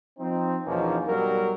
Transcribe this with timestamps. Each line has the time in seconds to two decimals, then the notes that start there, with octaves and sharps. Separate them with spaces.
0.19 F3 C4 D#4
0.66 E2 B2 F3 A#3 C#4 D#4
1.08 B1 F#3 G3 A#4